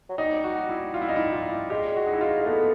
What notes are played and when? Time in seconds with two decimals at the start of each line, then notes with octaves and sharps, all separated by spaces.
0.10 F#3
0.18 G3 D#4
0.44 F#4
0.69 E4
0.94 F4
1.02 E4
1.08 D#4
1.16 E4
1.32 F4
1.70 G#3 G4
1.96 F#4
2.06 D#4
2.13 E4
2.21 F4
2.41 G#3
2.46 A3 B3